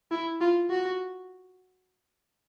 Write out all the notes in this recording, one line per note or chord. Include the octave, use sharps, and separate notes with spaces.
E4
F4
F#4